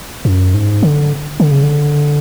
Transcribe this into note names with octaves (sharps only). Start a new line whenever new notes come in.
F#2
G#2
D3
D3
C#3
D3